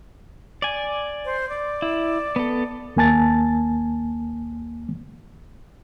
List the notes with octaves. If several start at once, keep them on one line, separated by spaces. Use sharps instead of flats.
D5 G#5
C5
D5
E4
B3 A4
D#2 A#3 G#5 A5 A6